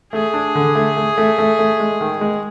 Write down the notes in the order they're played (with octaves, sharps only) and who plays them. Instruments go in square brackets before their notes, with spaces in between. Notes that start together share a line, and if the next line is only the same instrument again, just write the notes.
[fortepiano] A3 [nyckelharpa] G#4
[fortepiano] D4
D3
A3
A3
A3
A3
A3
G#3
D#3
G#3